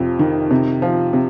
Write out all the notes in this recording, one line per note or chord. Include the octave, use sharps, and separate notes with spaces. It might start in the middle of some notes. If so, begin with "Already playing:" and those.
Already playing: F2 C3
D#3
C3
F3
C3